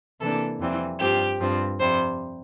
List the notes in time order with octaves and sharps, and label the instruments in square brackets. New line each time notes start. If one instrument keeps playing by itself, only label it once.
[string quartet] C3 E3 A#3 D4 A4
F2 E3 G3 C4
G2 F3 C4 G4
G2 F3 C4
F2 C3 G3 C5